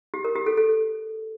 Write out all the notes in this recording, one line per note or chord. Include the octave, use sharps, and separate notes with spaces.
G4
A#4
G4
A4
A4